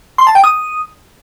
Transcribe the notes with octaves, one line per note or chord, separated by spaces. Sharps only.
C6
A5
G5
D#6